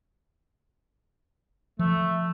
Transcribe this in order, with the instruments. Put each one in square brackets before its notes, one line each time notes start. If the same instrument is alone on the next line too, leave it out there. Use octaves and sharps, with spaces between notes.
[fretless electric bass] F3 [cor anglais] A3